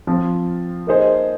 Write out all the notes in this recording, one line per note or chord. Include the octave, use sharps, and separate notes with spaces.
F3 C4 F4
A#3 D#4 G#4 C5